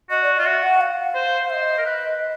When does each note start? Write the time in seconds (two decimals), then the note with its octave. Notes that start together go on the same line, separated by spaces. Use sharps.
0.10 F#4 D#5
0.23 D5
0.34 F4 D#5
0.46 F#4 E5
0.63 F#5
0.81 F5
1.15 C5
1.50 C5 D#5 E5
1.78 A#4
1.86 B4